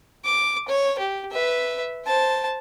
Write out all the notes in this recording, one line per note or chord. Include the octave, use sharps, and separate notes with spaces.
D6
C#5
G4
B4 E5
C5 A5